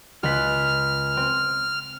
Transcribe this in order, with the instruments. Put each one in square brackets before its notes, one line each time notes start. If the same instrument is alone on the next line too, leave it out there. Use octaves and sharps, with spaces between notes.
[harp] C#2 F#6 B6 [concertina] F6
[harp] C4